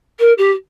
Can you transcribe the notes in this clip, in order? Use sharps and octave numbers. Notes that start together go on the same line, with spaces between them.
A#4
G4